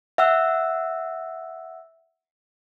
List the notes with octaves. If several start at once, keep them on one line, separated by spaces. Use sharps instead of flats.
E5 F#5 E6